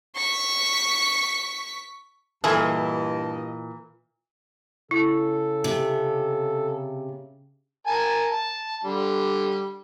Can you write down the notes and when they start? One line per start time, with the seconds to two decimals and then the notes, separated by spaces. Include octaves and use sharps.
0.16 C#6 B6
2.44 G2 A#2 E3 E4 G#4 A4 D#5 A5
4.91 C#3 E4 A4
5.64 C3
7.87 A#4 G#5 A5
8.31 A5
8.84 D3 G3